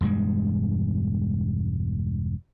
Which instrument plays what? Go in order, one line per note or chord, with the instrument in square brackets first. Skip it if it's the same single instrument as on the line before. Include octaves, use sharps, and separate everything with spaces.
[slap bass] E1 G2 G3 G#3